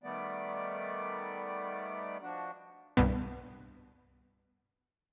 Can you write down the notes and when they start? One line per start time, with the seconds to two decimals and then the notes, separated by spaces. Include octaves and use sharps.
0.04 D#3 G3 A3 B3 D5
2.22 F3 D4 F#4
2.97 C2 G2 B2 B3